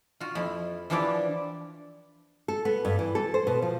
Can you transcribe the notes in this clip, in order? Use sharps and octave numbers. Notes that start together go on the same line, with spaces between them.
F4 F#4
F2 E4
E3 F3 D4 E4 G4 D5
A4
B3
G2
E3
A4
C5
B2
F3